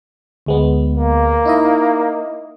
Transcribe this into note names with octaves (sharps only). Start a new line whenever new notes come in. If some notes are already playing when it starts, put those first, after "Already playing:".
D2 G#3 B3
A#3
D#4 E4 D#5